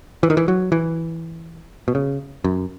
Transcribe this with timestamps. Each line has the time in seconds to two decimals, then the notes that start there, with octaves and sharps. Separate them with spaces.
0.23 E3
0.30 D#3
0.37 E3
0.48 F#3
0.72 E3
1.88 B2
1.95 C#3
2.45 F#2